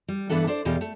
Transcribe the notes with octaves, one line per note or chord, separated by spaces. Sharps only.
G3
G2 E3 B3 D4 A4 F#5
D4 C5 D5
E2 B2 G4 G#4 F5
A3